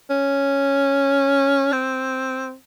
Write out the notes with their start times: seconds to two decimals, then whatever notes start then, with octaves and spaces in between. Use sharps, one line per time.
0.10 C#4
1.72 C4